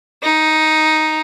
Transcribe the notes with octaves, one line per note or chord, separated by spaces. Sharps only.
D#4